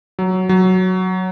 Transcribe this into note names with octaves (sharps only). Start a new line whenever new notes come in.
F#3
F#3